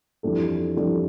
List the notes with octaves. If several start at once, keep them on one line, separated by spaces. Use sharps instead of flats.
F2 E3 G3 D4 A4
F2 E3 G3 D4 A4